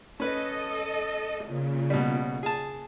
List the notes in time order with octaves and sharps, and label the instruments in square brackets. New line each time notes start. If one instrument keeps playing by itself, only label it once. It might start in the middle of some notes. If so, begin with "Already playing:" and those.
[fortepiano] C#4 B4 [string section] A4 D#5
[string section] A#2 C#3
[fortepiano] B2 G3
G#4 A5